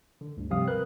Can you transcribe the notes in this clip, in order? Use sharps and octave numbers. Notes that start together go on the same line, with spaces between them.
D3
D2 G2
C3 F3 G3 C4 F5 D#6
A#4 B4 F#6